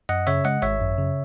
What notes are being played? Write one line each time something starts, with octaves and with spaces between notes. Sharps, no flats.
F#2 D#5 F#5
C#3 C#5 E5
G#3 D#5 F#5
G#1 C#5 E5
F#2
C#3